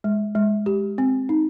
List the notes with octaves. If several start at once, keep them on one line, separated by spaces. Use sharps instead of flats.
G#3
G#3
G4
C4
D#4